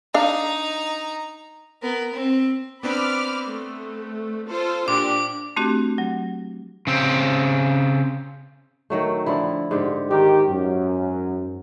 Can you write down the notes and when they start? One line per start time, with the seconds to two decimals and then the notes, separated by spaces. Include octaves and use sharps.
0.14 D4 D#4 F5 A#5
1.82 B3 A#4
2.13 C4
2.83 B3 C4 D4 B5 D6 F6
3.49 A3
4.48 F4 A4 C5
4.88 A#2 D4 G4 D6
5.56 A3 C4 D4 F#4 G4
5.98 F#3
6.87 C#3 C4
8.90 D#3 F#3 A3
9.26 D3 F3 E4
9.71 G#2 D3 G4
10.11 D#3 D#4 G4
10.49 F#2